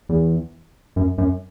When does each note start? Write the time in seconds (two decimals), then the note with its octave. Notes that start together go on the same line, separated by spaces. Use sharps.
0.09 E2
0.96 F#2
1.18 F#2